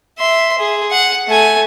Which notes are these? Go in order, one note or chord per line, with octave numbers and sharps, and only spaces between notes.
E5 C6
G#4
F#5
A3 G#5